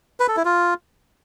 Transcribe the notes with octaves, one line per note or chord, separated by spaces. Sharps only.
B4
A4
E4
F4